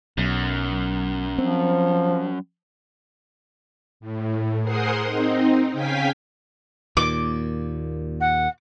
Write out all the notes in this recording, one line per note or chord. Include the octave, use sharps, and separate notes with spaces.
B1 F#2
F3 C4
A2
G#4 A#4 C5 F#5 C6 D#6
C4 D#4
C#3 F5 G5 G#5 B6
D#2 A#2 D6
F#5